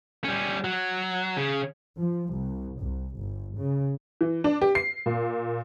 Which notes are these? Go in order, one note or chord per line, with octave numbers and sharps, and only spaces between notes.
G3 C#4
F#3
C#3
F3
C2
C2
G1
C#3
E3
D4
G4
C7
A#2